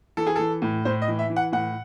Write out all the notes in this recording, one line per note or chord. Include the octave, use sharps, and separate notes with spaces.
E3 A4
G#4
E3 A4
A2
A2 C5
D#5
E3
E5
E3
F#5
A2 F#5